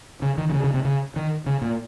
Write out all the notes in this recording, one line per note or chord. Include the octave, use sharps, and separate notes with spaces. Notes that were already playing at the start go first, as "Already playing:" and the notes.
C#3
D#3
D#3
C#3
C#3
C3
C#3
D#3
C#3
A#2